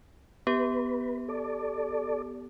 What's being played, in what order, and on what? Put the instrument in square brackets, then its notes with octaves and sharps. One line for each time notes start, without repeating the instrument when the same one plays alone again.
[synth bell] B3 G4 [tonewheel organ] B4
[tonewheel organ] A4 D5